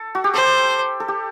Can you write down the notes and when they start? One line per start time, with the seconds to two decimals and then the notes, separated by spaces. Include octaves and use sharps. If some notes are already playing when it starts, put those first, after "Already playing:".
Already playing: A4
0.15 F#4
0.24 G4
0.34 A4 C5
1.00 A4
1.08 G4